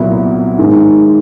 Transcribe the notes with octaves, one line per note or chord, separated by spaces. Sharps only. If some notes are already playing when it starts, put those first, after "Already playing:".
Already playing: C2 A#2 F#3 B3 E4
G#2 D#3 G#3